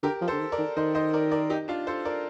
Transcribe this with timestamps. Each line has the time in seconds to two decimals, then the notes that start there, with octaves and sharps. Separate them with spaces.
0.03 D3 G4 A#4
0.21 F3
0.28 A4 C5
0.32 D3
0.40 D#3
0.52 A#4 D5
0.58 D#3
0.77 D#3 C5 D#5
0.95 C5 D#5
1.13 A#4 D5
1.31 A#4 D5
1.50 D#4 G4
1.68 D4 F4
1.87 A4 C5
2.05 A#4 D5